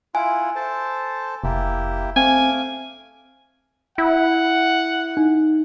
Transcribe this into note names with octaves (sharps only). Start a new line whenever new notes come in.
E4 F4 F#5 G#5
A4 C5 A5
F1 A#3 E4 G4
A3 C4 F5 G#5 D6
E4 F#5
D#4